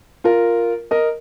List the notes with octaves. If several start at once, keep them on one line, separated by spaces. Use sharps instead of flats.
F4 A#4
A#4 D#5